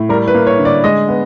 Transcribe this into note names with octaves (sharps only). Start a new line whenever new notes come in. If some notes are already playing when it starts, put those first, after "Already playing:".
Already playing: A2
G3 A#4
B4
A#3
C#5
D3
D5
G#3 D#5
B3